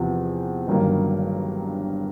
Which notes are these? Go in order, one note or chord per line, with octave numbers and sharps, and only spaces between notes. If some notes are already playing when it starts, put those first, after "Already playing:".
Already playing: E2 C3 F3
G1 G2 D#3 F#3 A#3